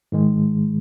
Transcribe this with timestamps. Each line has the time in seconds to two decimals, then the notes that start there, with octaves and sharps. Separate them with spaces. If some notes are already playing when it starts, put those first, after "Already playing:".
0.12 G#2 D#3 G#3